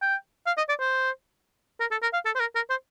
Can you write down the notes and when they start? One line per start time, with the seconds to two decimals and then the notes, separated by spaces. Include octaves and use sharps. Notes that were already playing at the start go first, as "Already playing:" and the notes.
0.02 G5
0.47 F5
0.57 D#5
0.69 D5
0.80 C5
1.80 A#4
1.91 A4
2.02 A#4
2.13 F5
2.26 A4
2.35 C5
2.40 A#4
2.55 A#4
2.70 C5